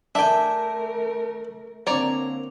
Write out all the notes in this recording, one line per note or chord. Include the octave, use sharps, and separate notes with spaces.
A3 D4 A#4 E5 G5 G#5
D3 A#3 C4 C#5 D5 A#5